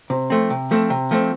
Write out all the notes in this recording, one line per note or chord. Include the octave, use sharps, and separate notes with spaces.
C3
F3 A3 C4
C3
F3 A3 C4
C3
F3 A3 C4